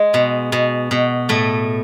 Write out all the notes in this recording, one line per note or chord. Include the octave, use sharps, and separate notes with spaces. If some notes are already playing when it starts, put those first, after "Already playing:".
Already playing: G#3
B2
B2
B2
A2 A3